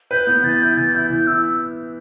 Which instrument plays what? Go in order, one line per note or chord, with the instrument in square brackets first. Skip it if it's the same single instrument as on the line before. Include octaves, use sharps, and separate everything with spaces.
[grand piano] B4 [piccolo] G6
[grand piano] B3 [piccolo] G6
[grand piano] E3 [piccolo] A6
[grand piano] E4 [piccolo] G6
[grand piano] E3 [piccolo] A6
[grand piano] E4 [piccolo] G6
[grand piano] E3 [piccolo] G6
[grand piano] E4 [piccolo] E6